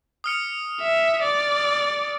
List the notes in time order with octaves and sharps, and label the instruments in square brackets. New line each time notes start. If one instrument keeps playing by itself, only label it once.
[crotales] D#6 F6 C#7
[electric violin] E5
D5